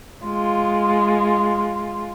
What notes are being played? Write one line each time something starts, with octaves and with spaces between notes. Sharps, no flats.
G#3 F4